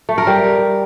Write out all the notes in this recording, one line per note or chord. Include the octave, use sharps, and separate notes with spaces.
A3
A#4
G3